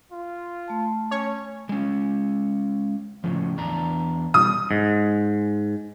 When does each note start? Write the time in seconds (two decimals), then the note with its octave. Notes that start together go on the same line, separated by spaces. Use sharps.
0.12 F4
0.68 A3 A5
1.11 C#4 C#5
1.69 G#3 C#4
3.24 A2 C#3 F3
3.57 E2 D4 A#5
4.34 B2 G3 D#6
4.71 G#2